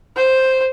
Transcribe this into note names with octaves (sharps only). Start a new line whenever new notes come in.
C5